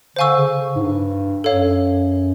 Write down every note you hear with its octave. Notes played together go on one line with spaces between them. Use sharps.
D3 C5 F5 G#5 C#6 E6
C#3
G#2
G2
F#2 A4 C#5 F5